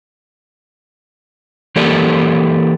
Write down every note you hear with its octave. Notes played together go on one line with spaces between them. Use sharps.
E3 A#3 G4 A4 A#4 D5